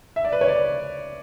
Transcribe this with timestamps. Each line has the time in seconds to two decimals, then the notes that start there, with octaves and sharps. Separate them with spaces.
0.16 E5
0.25 D5
0.33 B4
0.41 C#5
0.48 D5